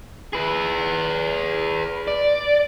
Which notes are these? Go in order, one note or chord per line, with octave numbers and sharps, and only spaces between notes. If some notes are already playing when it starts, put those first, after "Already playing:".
G#4 B4
D5